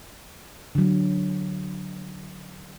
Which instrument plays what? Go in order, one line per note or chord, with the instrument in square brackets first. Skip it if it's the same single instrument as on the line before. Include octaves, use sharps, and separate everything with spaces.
[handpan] D3 F#3